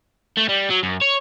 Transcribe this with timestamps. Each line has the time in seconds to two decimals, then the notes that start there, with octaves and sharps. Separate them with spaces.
0.37 A3
0.49 G3
0.70 F#3
0.83 F#2
1.02 C#5